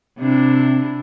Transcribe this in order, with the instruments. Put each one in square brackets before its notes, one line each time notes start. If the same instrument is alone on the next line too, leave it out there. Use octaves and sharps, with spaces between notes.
[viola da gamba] C3 D4 E4 [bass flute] C4